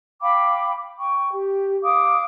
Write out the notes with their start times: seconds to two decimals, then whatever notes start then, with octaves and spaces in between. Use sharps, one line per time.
0.21 F5 G5 B5 D6
0.99 G5 C#6
1.31 G4
1.83 F5 D6 D#6